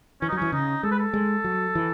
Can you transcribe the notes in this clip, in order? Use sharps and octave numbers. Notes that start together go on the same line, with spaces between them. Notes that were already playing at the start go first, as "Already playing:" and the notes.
E3 C#4
D#4
F#3
C#4
E3
C#3 D#4
G#3 A4
B4
A4
G#3
F#3
E3